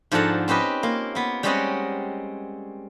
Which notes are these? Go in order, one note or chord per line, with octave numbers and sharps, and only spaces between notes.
G#2 F3 D4 A4 F#5 A#5
C4 C#4 G4 B4 D#5
A#3 F4
A#3 B3
G3 G#3 C4 C#4 D#5 F#5